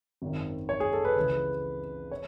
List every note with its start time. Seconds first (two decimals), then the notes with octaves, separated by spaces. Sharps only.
0.22 G#1 F#2 D#3
0.69 C#5
0.80 G#4
0.93 A4
1.05 B4
1.16 C#2 C#3 E3
2.11 C#5